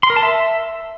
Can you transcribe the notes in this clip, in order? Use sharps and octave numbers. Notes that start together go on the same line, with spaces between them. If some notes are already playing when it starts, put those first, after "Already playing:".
C6
A#4
A5
E5